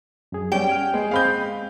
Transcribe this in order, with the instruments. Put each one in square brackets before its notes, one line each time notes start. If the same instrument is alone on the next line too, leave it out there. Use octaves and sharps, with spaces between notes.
[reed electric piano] F#2 G#4
[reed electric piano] G3 B3 C#4 [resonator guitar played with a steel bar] G5
[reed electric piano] G#5 F6
[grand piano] G#3 [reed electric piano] B3 G#4
[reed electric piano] G#3 C4 D#5 [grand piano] F5 B5 G6